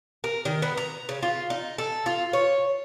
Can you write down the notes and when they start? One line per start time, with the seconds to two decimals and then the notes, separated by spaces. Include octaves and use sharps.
0.24 A#4
0.45 D#3
0.62 B3
0.77 A#5
1.09 C#3
1.23 F4
1.50 D#4
1.78 A4
2.06 F4
2.33 C#5